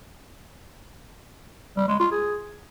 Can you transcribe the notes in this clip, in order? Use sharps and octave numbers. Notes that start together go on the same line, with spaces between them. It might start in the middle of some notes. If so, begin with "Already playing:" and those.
G3
G#3
F4
G#4